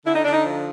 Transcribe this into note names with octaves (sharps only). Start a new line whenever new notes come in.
D3 E4
D#4
D3 D4
D#4
F3